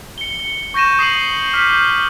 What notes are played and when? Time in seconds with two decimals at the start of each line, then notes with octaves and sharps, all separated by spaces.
0.18 C#7 G7
0.74 C#6 G6 A#6 D#7 E7
0.99 D#6 C7 D#7 F#7
1.53 D6 F6 G6 B6